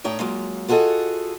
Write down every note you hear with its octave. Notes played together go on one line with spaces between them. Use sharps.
A2 D#4 C#5 G5
F#3 G#3 A#3 F4
F4 F#4 G#4 A4 D#5